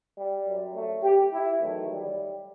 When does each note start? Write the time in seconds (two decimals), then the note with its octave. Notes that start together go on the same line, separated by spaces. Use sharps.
0.17 G3
0.46 F#2 F#3
0.75 A3
1.03 G4
1.32 E4
1.61 E2 D#3 F#3 A3
1.90 G3